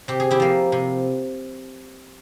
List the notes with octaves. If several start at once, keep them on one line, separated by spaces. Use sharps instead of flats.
C3 G4
G#4
E4 G4
F3 A#3
C3